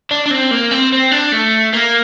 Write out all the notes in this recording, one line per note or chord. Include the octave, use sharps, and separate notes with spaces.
D4
D4
C4
A#3
C4
C4
D4
A3
A#3